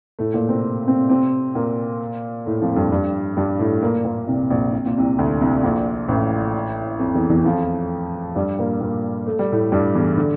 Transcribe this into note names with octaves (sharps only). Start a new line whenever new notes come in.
A2 A3
A#2 A#3
C3 C4
C3 C4
C3 C4
A#2 A#3
A2 A3
F2 F3
G2 G3
G2 G3
G2 G3
A2 A3
A#2 A#3
A#2 A#3
C2 C3
A#1 A#2
C3
A#2
C2 C3
D2 D3
C2 C3
A#1 A#2
A1 A2
F2
E2 E3
E2 E3
F2 F3
G2 G3
A#2 A#3
A#2 A#3
A3
G3
A2 A3
G2 G3
E2 E3
D3